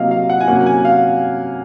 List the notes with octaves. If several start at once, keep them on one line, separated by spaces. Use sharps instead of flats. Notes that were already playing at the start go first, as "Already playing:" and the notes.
Already playing: C3 F#3 A#3 D#5 F5
F5
F#5
G#5
C3 F#3 A#3 C#4 F#5
G#5
F5